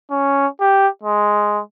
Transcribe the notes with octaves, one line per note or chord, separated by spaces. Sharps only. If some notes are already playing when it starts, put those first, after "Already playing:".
C#4
G4
G#3